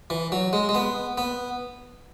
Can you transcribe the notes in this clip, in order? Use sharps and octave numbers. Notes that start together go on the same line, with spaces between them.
E3
F#3
G#3
G#3
B3
B3